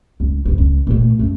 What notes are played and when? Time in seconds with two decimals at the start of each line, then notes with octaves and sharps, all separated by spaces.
0.20 C#2
0.45 E1 B1
0.58 C#2
0.87 A#2 A3
1.19 F#2 A3